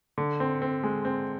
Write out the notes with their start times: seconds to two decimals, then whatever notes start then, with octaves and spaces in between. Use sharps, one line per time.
0.18 D3
0.40 C4
0.62 C4
0.83 G#3
1.05 C4